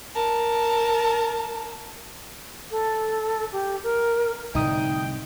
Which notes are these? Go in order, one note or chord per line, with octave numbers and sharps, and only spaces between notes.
A#4 A5
A4
G4
A#4
C2 A2 D3 D#4 G5 D#6